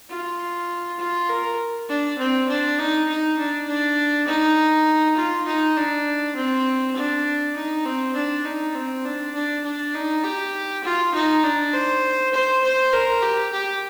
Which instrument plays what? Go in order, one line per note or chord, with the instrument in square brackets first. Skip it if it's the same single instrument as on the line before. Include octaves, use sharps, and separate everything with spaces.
[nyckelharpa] F4
F4
A#4
D4
C4
D4
D#4
D#4
D4
D4
D#4
F4
D#4
D4
C4
D4
D#4
C4
D4
D#4
C4
D4
D4
D4
D#4
G4
F4
D#4
D4
C5
C5
C5
A#4
G4
G4